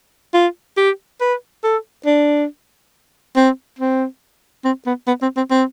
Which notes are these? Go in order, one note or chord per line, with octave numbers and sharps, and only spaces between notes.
F4
G4
B4
A4
D4
C4
C4
C4
B3
B3
C4
C4
C4